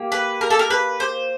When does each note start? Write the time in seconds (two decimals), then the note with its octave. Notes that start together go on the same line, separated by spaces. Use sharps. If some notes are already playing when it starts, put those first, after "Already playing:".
Already playing: A#3 G4
0.12 B4
0.41 A#4
0.50 A4
0.59 A#4
0.70 B4
1.00 C5